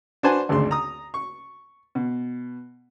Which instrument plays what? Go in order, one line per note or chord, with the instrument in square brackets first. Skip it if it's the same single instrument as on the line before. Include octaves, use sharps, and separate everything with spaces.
[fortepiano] D4 F#4 B4 C5 G#5 A5
G#1 D2 C#3 D4 C6
A#5 D#6
C#6
B2